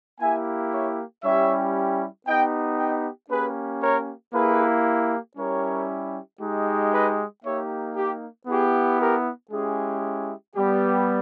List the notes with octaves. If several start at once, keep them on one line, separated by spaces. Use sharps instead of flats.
A#3 E4 G4 E5 G#5
C#5 E5
G3 C#4 E4 G4 C#5 E5
B3 D#4 G4 D#5 G5
D#5 G5
A#3 C#4 G4 G#4 B4
A#4 C#5
A#3 E4 G4 G#4 B4
G3 C#4 E4 G4 A#4 C#5
G#3 D#4 G4
B4 D#5
A#3 D#4 G4 C#5 E5
G4
B3 E4 G4 G#4
G4 A#4
G#3 C#4 E4 G4 G#4
G3 B3 G4